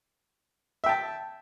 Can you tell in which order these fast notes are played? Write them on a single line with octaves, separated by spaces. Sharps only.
E5 G5 A5